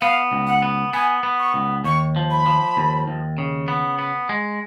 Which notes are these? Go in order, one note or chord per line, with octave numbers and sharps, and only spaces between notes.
B3 F5
C#2
F#5
B3
B3 G#5
B3
C#6
C#2
D#2 C#6
F3
B5
F3
D#2
D#2
C#3
B3
B3
G#3